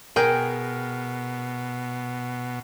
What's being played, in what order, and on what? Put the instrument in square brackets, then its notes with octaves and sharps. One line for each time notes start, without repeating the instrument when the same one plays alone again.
[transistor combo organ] B2 [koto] G#4 G5 [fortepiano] A#4